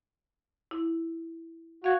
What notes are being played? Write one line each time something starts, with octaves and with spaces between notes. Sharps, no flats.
E4
F#4 F5 G#6